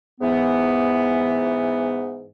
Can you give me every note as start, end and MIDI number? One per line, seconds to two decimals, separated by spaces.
0.21 2.27 44
0.21 2.27 52
0.21 2.27 59